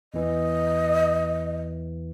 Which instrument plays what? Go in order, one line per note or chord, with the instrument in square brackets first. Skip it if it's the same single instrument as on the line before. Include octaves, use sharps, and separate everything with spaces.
[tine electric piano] E2 E3 [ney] D#5